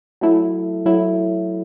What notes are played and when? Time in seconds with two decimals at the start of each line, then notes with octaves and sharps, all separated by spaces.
0.21 F#3 A3 E4
0.86 F#3 A3 E4